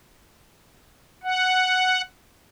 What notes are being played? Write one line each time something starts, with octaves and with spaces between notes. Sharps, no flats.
F#5